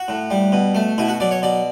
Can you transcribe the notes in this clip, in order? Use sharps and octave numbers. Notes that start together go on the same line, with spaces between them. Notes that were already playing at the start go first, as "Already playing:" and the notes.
Already playing: F#4
A2
G3
B2
A3
B2 E4
F#4
F#3 D5
C#5
B2 D5